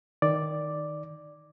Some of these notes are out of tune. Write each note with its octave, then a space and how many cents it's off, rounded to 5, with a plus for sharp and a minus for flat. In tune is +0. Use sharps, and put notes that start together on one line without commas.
D#3 +0 D5 +0